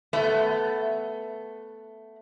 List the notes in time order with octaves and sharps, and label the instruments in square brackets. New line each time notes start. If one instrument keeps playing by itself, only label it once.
[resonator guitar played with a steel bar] A3 B3 E5